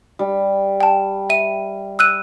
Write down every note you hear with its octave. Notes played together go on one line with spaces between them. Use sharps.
G3
G5 A5
E5 D#7
E6 F#6 D#7